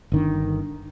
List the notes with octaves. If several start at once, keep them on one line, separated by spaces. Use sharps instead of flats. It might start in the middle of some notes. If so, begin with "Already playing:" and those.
G1 D#3 D4